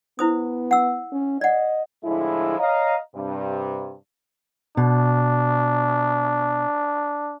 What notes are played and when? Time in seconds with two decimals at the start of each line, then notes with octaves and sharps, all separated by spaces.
0.19 B3 E4 C5 D#6
0.71 F#5 E6
1.12 C#4
1.41 D5 D#5 F#5
2.03 A2 D3 F3 G#3 E4
2.58 C#5 D#5 F5 A#5
3.15 G2 C3
4.77 B2 D4